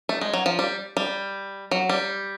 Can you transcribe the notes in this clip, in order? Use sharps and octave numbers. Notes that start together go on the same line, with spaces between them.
A3
G#3
F#3
F3
G3
G3
F#3
G3